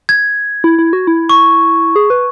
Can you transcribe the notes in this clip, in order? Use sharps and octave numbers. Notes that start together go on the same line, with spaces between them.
G#6
E4
E4
F#4
E4
C#6
G#4
B4